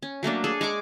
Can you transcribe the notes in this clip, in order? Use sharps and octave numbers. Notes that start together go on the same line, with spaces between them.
C#4
F#3 A3 A#3 D4
G#4 A4
G#3 G#5 C#6 D6